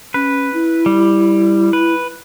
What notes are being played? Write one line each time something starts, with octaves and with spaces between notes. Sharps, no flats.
C#4 B4
E4
G3
B4